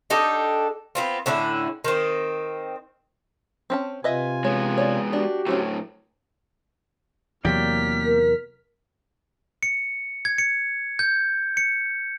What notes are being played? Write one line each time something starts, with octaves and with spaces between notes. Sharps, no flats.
D4 D#4 G4 A4
B3 C4 F4
A2 D3 C#4 E4
D#3 C4
C4 C#4 A5
C3 F4 B4 D#5 E5 G#5
G#3 B3 C#5
C#5 D5
D4 F#4 G4
A2 F#3 A3 C4 C#4
E2 C3 F#3 A#3 D5 G5 F6 B6
A#4
C#7
G#6
C#7
G6
C#7